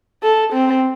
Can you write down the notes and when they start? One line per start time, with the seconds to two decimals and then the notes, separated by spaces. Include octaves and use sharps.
0.23 A4
0.53 C4